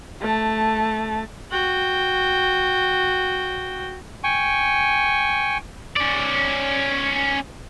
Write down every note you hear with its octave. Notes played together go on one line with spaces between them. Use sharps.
A3 A5
F#4 G5
G5 G#5 C#6
C#4 D5